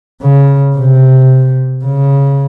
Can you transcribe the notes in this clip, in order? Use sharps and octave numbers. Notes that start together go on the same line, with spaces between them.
C#3
C3
C#3